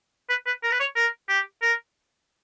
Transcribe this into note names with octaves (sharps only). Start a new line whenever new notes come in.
B4
B4
A#4
B4
C#5
A#4
G4
A#4